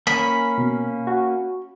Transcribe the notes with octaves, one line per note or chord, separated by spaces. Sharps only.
A#3 C#4 B5
B2
F#4